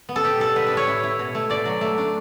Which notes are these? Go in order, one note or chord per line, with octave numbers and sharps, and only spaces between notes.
B3
A4
B2 G4
G3 A4
B3 B4
B4
A2
C#5
E4
E4
B2
A3
B2 D5
F#3
A3
D4